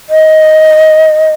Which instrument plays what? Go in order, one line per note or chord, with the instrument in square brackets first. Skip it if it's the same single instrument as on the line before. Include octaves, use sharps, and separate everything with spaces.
[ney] D#5